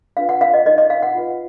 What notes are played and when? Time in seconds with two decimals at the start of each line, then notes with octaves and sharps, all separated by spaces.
0.17 D4 F4 B4 F5
0.29 F#5
0.41 F5
0.54 D#5
0.66 D#4 A#4 D#5
0.78 D#5
0.90 F5
1.03 F#5
1.15 F4 B4